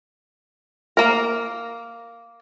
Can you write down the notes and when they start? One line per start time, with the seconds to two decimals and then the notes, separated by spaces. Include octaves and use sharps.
0.97 A#3 A#4